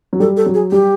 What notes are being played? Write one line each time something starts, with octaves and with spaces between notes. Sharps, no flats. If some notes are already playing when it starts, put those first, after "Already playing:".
F#3
G3 A4
A4
F#3
G#4
G3 G4